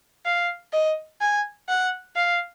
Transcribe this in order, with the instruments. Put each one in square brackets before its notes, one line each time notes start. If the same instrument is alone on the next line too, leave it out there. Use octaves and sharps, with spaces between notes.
[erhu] F5
D#5
G#5
F#5
F5